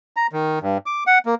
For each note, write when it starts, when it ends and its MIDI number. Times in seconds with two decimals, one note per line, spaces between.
0.17 0.27 82
0.32 0.59 51
0.62 0.78 43
0.86 1.04 86
1.07 1.19 78
1.26 1.35 58